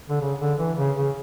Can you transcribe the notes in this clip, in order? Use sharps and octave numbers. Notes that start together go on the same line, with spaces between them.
D3
C#3
D3
E3
C#3
C#3